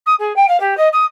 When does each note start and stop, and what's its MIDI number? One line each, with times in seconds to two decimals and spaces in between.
0.06 0.14 87
0.19 0.35 68
0.36 0.47 79
0.48 0.59 77
0.60 0.76 67
0.77 0.88 75
0.92 1.04 87